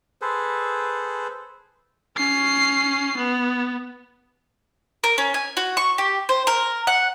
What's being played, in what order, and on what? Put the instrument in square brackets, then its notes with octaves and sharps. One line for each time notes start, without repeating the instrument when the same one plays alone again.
[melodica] G#4 A4 B4 C5
[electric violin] C#4 C7
B3
[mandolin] A#4
C#4
G#5
F#4
C#6
G4
C5
A#4
F#5